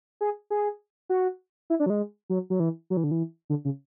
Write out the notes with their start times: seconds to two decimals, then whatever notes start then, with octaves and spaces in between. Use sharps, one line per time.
0.21 G#4
0.50 G#4
1.09 F#4
1.70 E4
1.80 D4
1.86 F#3
1.90 G#3
2.30 F#3
2.50 F#3
2.60 E3
2.90 F#3
2.97 E3
3.04 D3
3.11 E3
3.50 D3
3.65 C#3